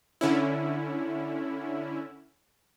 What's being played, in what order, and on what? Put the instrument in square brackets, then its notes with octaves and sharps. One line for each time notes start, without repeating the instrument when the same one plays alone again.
[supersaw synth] D3 C#4 E4